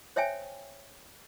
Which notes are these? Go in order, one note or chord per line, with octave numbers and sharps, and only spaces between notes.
C5 C#5 E5 G5 G#5